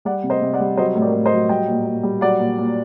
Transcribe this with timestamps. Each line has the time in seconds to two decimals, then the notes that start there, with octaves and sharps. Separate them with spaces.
0.05 G3 D5 F#5
0.23 C3
0.30 C5 D#5
0.42 C3
0.54 D5 F#5
0.60 G3
0.77 F#3 C5 D#5
0.95 A2
1.02 A#4 D5
1.14 A2
1.25 C5 D#5
1.32 F#3
1.49 G3 D#5 G5
1.68 A#2
1.86 A#2
2.03 G3
2.21 F#3 D5 F#5
2.40 A#2
2.58 A#2